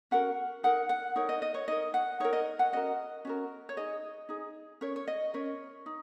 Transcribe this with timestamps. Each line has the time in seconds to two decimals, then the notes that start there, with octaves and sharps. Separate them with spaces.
0.11 C#4 F#4 A#4 F#5
0.63 D#4 A#4 F#5
0.89 F#5
1.16 D#4 A#4 C#5
1.29 D#5
1.42 D#5
1.54 C#5
1.68 D#4 A#4 D#5
1.94 F#5
2.20 D#4 A#4 C#5
2.33 D#5
2.59 F#5
2.72 C#4 F#4 A#4 D#5
3.25 C#4 F#4 A#4
3.69 C#5
3.77 D#4 G#4 D#5
4.29 D#4 G#4
4.81 C#4 A#4 C#5
4.96 C#5
5.07 D#5
5.34 C#4 A#4 C#5
5.86 D#4